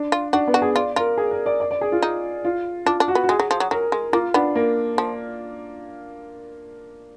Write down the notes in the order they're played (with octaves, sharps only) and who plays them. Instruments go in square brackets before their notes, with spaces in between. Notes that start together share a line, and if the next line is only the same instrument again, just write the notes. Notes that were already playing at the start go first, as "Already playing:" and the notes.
Already playing: [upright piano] D4
[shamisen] F4
[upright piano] D4 [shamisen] F#4
[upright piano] B3
[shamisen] F#4
[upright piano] G#4
[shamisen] F4 [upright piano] D5
[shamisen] F4 [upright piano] A#4
[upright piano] G#4
A#4
D5
D5
D5
G#4
F4
[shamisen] D#4
[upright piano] F4
[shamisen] D4 [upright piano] F4
[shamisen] D4
[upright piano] F#4
[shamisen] B3
[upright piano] F#4
[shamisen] G#3 [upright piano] G#4
[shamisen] F#3
F3
F#3
[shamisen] F#3 [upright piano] A#4
[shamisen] G#3
[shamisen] A#3 [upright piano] F4
[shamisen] B3 [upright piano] D4
[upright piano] A#3
[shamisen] F3